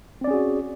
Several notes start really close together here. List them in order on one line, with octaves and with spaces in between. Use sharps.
C4 D5 C#4 G#4 F#4